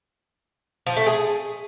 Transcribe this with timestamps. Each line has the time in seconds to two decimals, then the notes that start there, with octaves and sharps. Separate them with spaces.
0.86 F3
0.96 A3
1.06 G#4